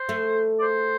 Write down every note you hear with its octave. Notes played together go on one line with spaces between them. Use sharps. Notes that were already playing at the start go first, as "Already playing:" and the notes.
Already playing: C5
A3
D5
C5